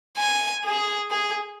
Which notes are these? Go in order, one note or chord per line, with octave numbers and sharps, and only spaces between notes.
G#5
G#4
G#4